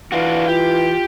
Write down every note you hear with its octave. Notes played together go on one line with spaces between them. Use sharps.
E3 D4 F4 F#4
F4 G4